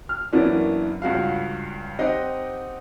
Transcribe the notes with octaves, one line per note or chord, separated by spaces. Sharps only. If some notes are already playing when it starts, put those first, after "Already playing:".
F6
F#2 E3 A#3 B3 C#4 D4
C#2 G2 F#4 F5
C4 D#4 G4 D#5 F#5